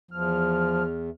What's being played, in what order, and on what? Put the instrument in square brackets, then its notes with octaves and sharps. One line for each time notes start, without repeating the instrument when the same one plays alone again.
[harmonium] E2 [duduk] F3 [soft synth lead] F6